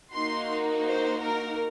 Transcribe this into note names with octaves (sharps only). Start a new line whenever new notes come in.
A#3 D#4 F#4 C6
C5
A#4